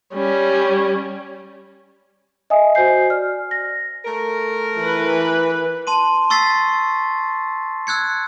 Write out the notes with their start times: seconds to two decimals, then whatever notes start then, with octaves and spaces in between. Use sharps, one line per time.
0.14 G3 C#4
2.50 D#5 E5 G#5 D#6
2.75 F#4 C5 G#5 G6 C7
3.10 D5 F6
3.51 A#6
4.04 A3 A#4
4.77 E3 B4
5.87 A5 C6 D#7
6.30 C#6 E6 A6 B6 C7
7.87 E6 F#6 G#6 C#7